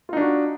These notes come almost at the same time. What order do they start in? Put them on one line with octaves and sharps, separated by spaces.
F4 D#4 D4 F#4